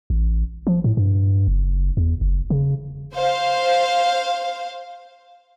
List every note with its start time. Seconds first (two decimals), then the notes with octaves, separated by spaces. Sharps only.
0.10 A1
0.67 F3
0.84 A2
0.97 G2
1.47 F#1
1.97 E2
2.21 F#1
2.50 C#3
3.13 C5 F5